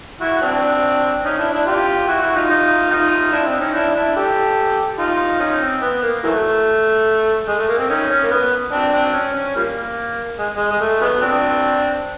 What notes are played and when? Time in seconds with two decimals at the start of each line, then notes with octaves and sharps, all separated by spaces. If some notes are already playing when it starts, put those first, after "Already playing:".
0.21 E4 F#4
0.42 C4 D4
1.25 C#4 D#4
1.39 D4 E4
1.53 D4 E4
1.66 F4 G4
2.08 E4 F#4
2.22 E4 F#4
2.36 D#4 F4
2.49 D#4 F4
2.91 D#4 F4
3.32 D4 E4
3.46 C4
3.60 C#4 D#4
3.74 D4 E4
3.95 D4 E4
4.16 G4 A4
4.99 D#4 F4
5.40 C#4 D#4
5.61 C4
5.82 B3
6.03 A#3
6.24 E3 F#3 A3
7.48 G#3
7.59 A3
7.69 A#3
7.79 C4
7.89 C#4 D#4
8.10 C#4
8.23 A#3
8.31 B3
8.73 C4 D4
8.93 C4 D4
9.14 C#4
9.34 C#4
9.56 F3 G3 A#3
10.38 G#3
10.57 G#3
10.71 G#3
10.81 A3
11.02 F#3 G#3 B3
11.22 C4 D4